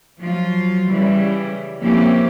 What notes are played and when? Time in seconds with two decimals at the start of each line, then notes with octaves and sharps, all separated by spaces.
0.19 F3 F#3 F4
0.88 C#3 E3 G3
1.81 E3 F3 A#3 C4 C#4 G4